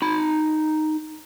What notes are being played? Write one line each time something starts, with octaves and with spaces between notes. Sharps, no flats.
D#4 B5